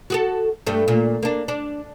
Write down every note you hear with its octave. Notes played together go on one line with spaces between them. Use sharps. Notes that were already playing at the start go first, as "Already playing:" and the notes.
F#4 G#4 A4
G2 A3
A#2
A#3 D4
D4